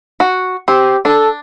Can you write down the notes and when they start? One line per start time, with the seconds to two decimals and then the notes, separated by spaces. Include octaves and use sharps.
0.20 F#4
0.68 C4 G4
1.05 D4 A4